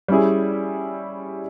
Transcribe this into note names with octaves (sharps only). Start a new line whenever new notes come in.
G3 C#4 E4 G#4